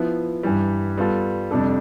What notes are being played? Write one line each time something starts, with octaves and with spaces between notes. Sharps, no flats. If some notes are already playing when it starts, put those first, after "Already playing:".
Already playing: F3 B3 E4
G2 E3 G3
G3 B3 F4 A4
F2 C3 G3 D4 A4